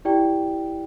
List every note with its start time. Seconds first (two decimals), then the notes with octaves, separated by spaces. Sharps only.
0.05 E4 G4 D5 G5